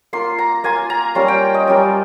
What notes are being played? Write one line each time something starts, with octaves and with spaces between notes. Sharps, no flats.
A#3 F4 C6
A#5
A#3 F4 G#5
A#5
G3 A#3 C#4 F4 C6
G5
D#5
G3 A#3 C#4 F4